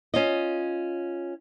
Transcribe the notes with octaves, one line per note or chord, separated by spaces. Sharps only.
C#4 F4 D#5